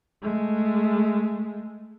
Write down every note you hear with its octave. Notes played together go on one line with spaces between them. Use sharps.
G#3 A3